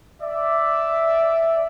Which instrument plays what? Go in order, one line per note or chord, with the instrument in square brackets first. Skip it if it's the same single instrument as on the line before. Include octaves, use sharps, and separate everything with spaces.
[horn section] D5 E5